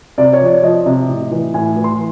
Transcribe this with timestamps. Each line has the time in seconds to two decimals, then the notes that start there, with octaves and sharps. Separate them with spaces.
0.18 C3 D5
0.33 C#5
0.41 F3
0.48 D5
0.63 F3 D#5
0.86 C3
1.09 A2
1.31 E3
1.54 A2 G#5
1.76 E3
1.84 C6